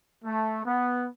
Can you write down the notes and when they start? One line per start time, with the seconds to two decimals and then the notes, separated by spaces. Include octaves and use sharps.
0.24 A3
0.65 B3